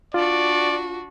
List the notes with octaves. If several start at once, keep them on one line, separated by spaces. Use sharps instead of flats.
D4 F4 F#4 D5